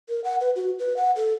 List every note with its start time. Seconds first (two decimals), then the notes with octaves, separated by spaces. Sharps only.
0.09 A#4
0.24 F#5
0.41 B4
0.56 F#4
0.79 B4
0.97 F#5
1.16 A4